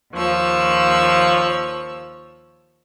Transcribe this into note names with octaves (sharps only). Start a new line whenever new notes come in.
D#2 F3 C#5 E6